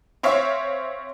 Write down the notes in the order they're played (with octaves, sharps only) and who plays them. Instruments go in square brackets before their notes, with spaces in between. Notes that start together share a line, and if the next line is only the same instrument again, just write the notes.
[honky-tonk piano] C4 C#5 E5 F5